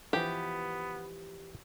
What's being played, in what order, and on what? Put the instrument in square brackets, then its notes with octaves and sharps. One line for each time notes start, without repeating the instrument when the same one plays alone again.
[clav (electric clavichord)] E3 F3 [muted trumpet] B3 [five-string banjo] G4